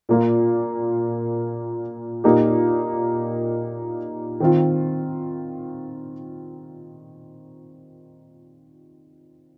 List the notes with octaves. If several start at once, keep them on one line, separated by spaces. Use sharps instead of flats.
A#2 A#3 F4
A#2 A#3 D#4 G4
D#3 C4 F4